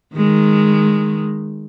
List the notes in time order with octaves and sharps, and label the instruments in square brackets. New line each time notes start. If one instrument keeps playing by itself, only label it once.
[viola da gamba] D#3 G#3